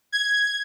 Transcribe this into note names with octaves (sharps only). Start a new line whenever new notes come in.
G#6